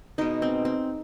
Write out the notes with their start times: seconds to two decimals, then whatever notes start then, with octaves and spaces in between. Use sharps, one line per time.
0.18 B2 G#3 B3 D#4
0.42 C4
0.65 C4